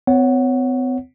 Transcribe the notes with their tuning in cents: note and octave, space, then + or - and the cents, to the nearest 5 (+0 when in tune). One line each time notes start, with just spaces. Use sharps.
C4 -45 C#5 +0 F#5 +0